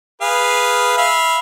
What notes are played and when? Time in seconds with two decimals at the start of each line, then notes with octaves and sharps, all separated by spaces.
0.21 G#4 B4 F5
0.98 E5 F5 B5